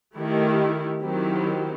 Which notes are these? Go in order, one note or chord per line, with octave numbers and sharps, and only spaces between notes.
D#3 A3 E4 G4
D#3 F#3 C4 E4 G4